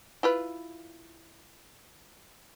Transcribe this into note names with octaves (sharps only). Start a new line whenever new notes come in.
E4 F4 B4